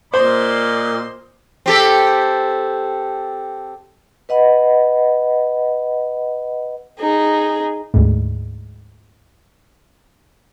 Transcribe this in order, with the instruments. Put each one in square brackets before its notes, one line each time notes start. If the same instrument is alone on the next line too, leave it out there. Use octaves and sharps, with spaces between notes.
[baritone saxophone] A#2 [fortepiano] C5 [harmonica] D5 D#5 C6
[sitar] C4 G4 A4
[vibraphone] B4 D#5 F#5 B5
[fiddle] D#4 G#4
[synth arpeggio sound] D2 G#2